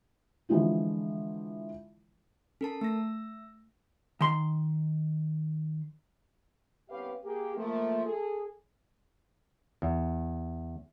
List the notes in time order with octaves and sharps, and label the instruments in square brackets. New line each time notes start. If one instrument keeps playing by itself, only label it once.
[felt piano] D3 E3 F3 G#3 E4 F4
[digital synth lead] C#4 [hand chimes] A4 A#4 A5
[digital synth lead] A3 [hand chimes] E6 A#6
[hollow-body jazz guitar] D#3 C6
[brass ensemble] C2 B3 C#4 G4 B4 F5
A#3 G4 G#4
F3 A3 A#3
G#4 A4
[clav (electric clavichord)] E2